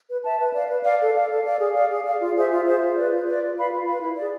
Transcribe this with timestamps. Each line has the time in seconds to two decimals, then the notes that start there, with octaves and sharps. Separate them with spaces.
0.09 B4
0.24 E5 A5
0.39 B4
0.54 D5 F5
0.69 B4
0.84 D5 F5
1.00 A4
1.15 D5 F5
1.30 A4
1.45 D5 F5
1.59 G#4
1.74 D5 F5
1.90 G#4
2.05 D5 F5
2.20 F4
2.35 G#4 C5 E5
2.50 F4
2.65 G#4 C5 E5
2.80 F4
2.96 B4 D5
3.11 F4
3.25 B4 D5
3.41 F4
3.56 B4 F5 B5
3.71 F4
3.86 B4 F5 B5
4.01 E4
4.16 G#4 D5